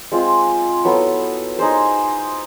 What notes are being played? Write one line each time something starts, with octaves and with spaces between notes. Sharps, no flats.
G#3 C4 F4 G#4
F#3 B3 E4 A4
D#4 G#4 C5